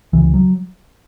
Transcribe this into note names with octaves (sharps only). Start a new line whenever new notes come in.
C#2 C#3 E3
F#3